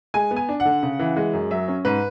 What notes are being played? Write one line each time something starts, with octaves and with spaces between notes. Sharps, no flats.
G#3 G#5
B3
G#5
D4
F#5
D3
C#3
E3
G#3
F#2
F#3 E5
C#4
G#2 B4